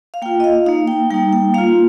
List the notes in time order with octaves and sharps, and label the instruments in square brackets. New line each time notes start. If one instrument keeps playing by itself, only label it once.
[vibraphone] F5
A#3 G5
F4
D#5
F5
A#3 D#4 F5
G5
G3 A#3 D#4 G5
G5
A#3 F5
F4